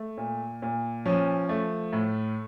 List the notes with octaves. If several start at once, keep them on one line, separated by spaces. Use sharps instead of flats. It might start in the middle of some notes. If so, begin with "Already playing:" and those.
Already playing: A3
A#2
A#2
F3 C#4
A3
A2